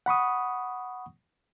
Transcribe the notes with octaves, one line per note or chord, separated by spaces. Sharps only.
F#5 B5 C#6 D#6